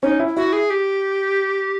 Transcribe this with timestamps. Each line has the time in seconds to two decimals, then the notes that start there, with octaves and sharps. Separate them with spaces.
0.03 C#4 D#4
0.20 E4
0.37 E4 F#4
0.53 G#4
0.70 G4